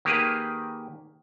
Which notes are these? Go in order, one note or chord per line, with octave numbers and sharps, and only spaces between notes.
D#3 A#3 G4 G#4 B4